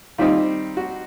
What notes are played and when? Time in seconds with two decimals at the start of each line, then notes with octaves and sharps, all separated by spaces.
0.18 D#3 G3 C4 D#4 F4
0.77 F#4